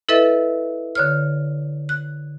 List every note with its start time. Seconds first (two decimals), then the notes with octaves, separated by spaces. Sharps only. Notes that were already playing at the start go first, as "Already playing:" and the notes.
0.09 E4 A4 B4 D#5 E5 A6
0.95 D3 C#5 F6
1.89 F#6